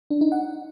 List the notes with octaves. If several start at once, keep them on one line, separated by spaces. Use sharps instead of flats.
D4
D#4
F#5